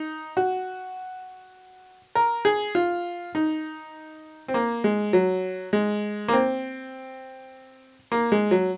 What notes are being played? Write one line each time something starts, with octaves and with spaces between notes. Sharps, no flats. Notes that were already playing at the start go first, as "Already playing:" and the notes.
Already playing: D#4
F#4
A#4
G#4
F4
D#4
C4
A#3
G#3
F#3
G#3
A#3
C4
A#3
G#3
F#3